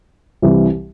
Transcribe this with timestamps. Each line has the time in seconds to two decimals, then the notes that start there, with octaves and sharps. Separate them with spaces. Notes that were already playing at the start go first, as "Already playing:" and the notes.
0.42 C2 C3 E3 G3